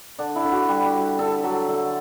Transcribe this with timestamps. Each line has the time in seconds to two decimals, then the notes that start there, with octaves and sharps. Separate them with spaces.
0.19 D3 D4
0.35 E4
0.44 D3
0.52 F#4
0.68 G3 G4
0.94 G3
1.19 D3 A4
1.43 F#3
1.68 D3